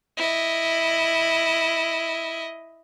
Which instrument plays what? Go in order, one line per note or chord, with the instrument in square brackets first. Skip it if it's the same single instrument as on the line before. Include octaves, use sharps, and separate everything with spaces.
[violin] E4 D#5